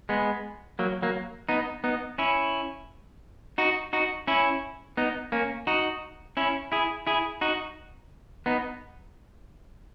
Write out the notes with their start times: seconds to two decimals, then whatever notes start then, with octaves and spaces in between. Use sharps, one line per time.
0.09 G#3 B3
0.79 F#3 A#3
1.02 F#3 A#3
1.49 B3 D#4
1.84 B3 D#4
2.18 C#4 E4
3.58 D#4 F#4
3.93 D#4 F#4
4.27 C#4 E4
4.97 B3 D#4
5.32 A#3 C#4
5.67 D#4 F#4
6.37 C#4 E4
6.72 E4 G#4
7.07 E4 G#4
7.41 D#4 F#4
8.46 B3 D#4